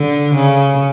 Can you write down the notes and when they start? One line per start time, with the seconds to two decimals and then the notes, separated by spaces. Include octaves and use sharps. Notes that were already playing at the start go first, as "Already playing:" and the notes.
Already playing: D3
0.35 C#3